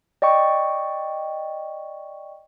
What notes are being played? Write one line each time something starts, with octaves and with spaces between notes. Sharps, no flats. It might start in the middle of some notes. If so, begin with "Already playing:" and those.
D5 D#5 G5 C#6